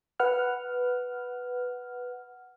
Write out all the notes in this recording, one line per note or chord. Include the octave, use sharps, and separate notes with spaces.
B4 F#5 F6